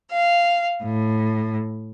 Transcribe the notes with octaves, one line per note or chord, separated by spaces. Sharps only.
F5
A2